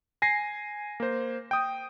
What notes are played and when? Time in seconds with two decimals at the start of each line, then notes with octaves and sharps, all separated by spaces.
0.22 G#5 A#6 C7
1.00 A#3 C5
1.51 G5 D#6